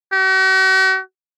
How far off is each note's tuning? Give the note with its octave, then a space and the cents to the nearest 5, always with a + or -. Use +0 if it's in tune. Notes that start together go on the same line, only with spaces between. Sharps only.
F#4 +45